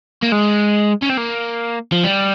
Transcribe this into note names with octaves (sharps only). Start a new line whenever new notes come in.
A#3
G#3
C#4
C4
A#3
F3
G3